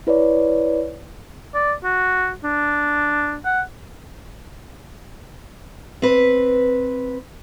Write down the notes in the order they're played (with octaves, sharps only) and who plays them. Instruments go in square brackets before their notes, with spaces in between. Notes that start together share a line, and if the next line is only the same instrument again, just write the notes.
[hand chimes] E4 B4 C#5 D5
[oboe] D5
F#4
D4
F#5
[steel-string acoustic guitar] C4 B4